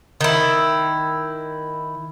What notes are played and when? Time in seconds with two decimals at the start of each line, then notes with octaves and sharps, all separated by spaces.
0.21 D#3 E4